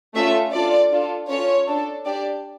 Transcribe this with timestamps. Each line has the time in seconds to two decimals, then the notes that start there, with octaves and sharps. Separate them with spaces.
0.15 A3 C#4 F4 A4 E5
0.53 D4 F4 A4 D5
0.92 D4 F4 A4
1.29 C#4 F4 A4 C#5
1.68 D4 A4
2.05 D4 G4 D5